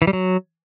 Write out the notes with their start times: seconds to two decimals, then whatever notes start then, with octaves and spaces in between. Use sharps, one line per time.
0.02 E3
0.07 G3
0.13 F#3